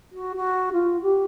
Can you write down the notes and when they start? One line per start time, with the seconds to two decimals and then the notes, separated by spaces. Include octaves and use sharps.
0.13 F#4
0.36 F#4
0.72 F4
1.02 G4